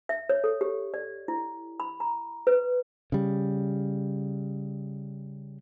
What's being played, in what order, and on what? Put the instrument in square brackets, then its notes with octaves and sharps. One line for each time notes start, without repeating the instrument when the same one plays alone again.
[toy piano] E5
C#5
A4
G4
D5
E4
B5
A#5
B4
[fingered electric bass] C#3 G3